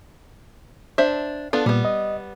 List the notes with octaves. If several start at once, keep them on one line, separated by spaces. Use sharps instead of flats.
D4 C5 E5
B3 D4 F4 A4
A#2 G3 B3
D#5